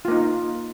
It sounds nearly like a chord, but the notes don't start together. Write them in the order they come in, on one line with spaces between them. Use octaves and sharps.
F4 A#3 D#4